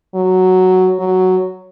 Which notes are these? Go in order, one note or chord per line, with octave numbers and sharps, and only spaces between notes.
F#3
F#3